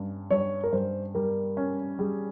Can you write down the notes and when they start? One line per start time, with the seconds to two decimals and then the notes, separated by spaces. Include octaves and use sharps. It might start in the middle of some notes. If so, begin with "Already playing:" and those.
Already playing: G2 C#4
0.30 G2 C#5
0.64 A#4
0.72 G2 C5
1.15 G3 A#4
1.57 C#4
1.99 G3 G#4